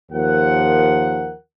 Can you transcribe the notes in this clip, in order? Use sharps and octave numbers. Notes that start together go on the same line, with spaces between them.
D#2 F3 A#4 F#5